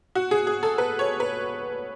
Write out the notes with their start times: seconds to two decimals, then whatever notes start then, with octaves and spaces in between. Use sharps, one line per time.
0.15 F#4
0.31 G#4
0.47 G#4
0.63 A4
0.78 B4
0.99 C#5
1.20 B4